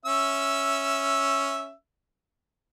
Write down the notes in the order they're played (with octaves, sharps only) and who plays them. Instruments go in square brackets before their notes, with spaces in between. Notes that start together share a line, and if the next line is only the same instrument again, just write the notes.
[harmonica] C#4 E5 E6